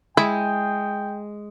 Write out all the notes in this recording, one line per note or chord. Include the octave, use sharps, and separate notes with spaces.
G#3 E4 G5